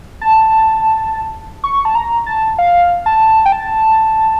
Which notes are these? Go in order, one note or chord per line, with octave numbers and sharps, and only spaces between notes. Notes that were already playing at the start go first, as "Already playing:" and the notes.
A5
C#6
A5
A#5
A5
F5
A5
G5
A5